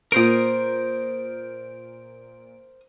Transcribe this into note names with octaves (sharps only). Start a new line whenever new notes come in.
A#2 A#4 C5 D#6 D7